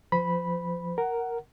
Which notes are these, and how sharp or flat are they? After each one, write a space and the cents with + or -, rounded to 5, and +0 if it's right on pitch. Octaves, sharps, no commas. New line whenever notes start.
F3 +0 C5 -40 B5 -10
A#4 +0 F#5 +10